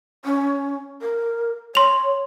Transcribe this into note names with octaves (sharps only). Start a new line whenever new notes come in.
C#4
A#4
C#5 C6 F7